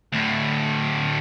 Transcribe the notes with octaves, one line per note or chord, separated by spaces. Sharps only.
D2 A2